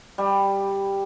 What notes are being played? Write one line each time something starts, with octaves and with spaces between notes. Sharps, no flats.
G3